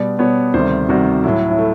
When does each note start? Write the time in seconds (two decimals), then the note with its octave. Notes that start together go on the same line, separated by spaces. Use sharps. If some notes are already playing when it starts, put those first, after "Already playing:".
Already playing: B2 G3 B3 D5
0.19 B2 G3 B3 C#5
0.54 D2 C3 D#3 G3 C5
0.89 D2 C3 D#3 G3 F#4
1.24 A2 F#3 A3 E4
1.51 E4
1.59 A3